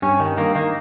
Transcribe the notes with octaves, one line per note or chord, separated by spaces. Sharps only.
G2 C#4
D#3
D#3 A#3
D#3 A#3